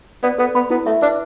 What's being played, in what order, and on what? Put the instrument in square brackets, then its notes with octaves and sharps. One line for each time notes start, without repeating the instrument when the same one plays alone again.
[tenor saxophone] B3 [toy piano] D5
[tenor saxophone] B3 [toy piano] A4
[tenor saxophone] B3 [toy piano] B5
[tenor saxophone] B3 [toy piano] E4
[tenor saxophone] A3 [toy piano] E5
[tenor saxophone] D4 [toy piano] B4